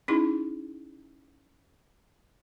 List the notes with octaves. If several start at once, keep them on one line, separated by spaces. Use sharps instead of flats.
C#4 D#4 E4 G#4